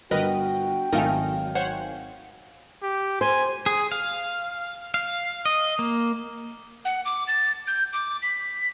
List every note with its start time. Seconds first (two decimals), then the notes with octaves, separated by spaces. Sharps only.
0.11 G1 F#4 A#4 B4 D#5 G5
0.93 G#1 F#3 A3 D#4 A#4 F5 G#5
1.55 C5 C#5 F#5
2.83 G4
3.21 C5 G#5
3.66 G#4
3.92 F5
4.94 F5
5.45 D#5
5.79 A#3
6.85 F#5
7.05 D6
7.28 A6
7.67 G6
7.93 D6
8.22 B6